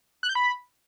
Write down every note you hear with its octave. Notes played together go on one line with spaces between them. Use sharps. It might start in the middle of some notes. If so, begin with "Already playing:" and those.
F#6
G6
B5